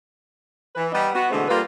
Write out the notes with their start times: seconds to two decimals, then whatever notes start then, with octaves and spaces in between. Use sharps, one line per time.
0.76 E3 B4
0.92 G3 B3 D#4
1.15 B3 F#4
1.31 B2 D3 E3 G#3 A3 C4
1.48 G3 A#3 F4 A4 B4